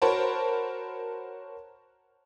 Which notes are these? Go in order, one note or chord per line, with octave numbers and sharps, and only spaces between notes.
F#4 A#4 C5 C#5 A5 B5